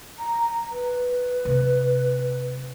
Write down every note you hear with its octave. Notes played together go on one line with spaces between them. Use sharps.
A#5
B4
C3